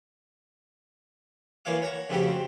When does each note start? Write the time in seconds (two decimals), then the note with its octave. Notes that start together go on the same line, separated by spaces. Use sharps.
1.65 E3 A#3 C#5 F5 D6
1.82 C#5 F#5 A#5 C#6
2.09 F2 C#3 A3 C4 F#4 G4
2.28 C4